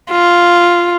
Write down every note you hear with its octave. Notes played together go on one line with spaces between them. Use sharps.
F4